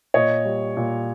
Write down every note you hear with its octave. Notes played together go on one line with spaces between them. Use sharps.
A#2 C#5 D#5
G3
A#2